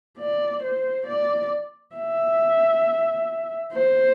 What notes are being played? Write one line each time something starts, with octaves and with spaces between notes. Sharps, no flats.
D5
C5
D5
E5
C5